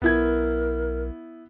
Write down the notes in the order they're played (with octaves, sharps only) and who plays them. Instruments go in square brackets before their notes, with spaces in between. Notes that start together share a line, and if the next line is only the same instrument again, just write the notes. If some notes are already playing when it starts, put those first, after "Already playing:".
[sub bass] B1 [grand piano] B3 E4 G#6 [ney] A#4